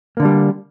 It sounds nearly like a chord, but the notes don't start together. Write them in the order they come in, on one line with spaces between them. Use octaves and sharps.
A#3 D3 D4 G3